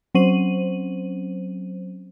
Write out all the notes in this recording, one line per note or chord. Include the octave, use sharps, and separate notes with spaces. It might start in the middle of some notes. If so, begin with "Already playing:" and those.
F#3 C4 C#4 C5 D#7 F#7